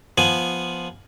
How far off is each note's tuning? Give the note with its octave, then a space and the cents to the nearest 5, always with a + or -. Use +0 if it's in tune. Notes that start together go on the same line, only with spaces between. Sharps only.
F3 +0 B3 -10 G#5 +0